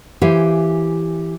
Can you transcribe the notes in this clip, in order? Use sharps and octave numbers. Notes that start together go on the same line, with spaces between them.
E3 G4 C5 F5 G#5